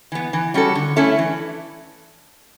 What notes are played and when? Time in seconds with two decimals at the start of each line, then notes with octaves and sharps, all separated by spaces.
0.12 E3 B3
0.33 E3
0.54 G3 C#4 F#4 A4
0.75 D3
0.96 A3 C#4 E4 A4
1.19 E3